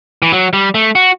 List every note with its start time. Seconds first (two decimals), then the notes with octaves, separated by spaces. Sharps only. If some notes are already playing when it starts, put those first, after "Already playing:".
0.22 E3
0.32 F#3
0.53 G3
0.75 A3
0.95 F#4